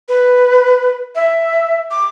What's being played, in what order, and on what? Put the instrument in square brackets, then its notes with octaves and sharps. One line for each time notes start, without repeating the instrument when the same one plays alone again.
[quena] B4
E5
D6